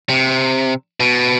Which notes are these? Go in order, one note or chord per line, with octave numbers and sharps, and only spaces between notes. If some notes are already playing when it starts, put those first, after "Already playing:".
C3
B2